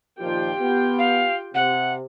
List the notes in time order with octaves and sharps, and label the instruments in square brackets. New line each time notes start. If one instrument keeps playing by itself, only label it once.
[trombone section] A#2 D#3 F3 [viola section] F4 G4 G5
[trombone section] B3
[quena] F5
[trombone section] C3 [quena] F#5